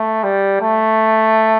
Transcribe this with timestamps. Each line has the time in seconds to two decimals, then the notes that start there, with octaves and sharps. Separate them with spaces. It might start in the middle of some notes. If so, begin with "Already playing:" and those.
Already playing: A3
0.23 G3
0.62 A3